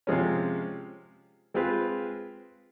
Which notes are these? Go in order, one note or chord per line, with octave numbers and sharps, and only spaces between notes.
C3 F3 G#3 C#4
G#3 C4 F4 G#4 B4